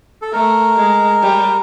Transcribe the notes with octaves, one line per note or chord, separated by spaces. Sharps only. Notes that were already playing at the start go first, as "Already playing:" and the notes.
A4
A3 A#4
G#3
G3